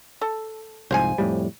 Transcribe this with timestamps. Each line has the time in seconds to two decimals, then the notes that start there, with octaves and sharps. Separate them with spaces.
0.21 A4
0.91 C2 F2 G#2 C5 F5 G#5
1.18 F2 A2 G3